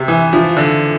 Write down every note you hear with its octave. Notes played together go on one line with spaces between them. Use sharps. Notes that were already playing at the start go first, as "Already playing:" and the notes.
Already playing: C3
E3
F3
D3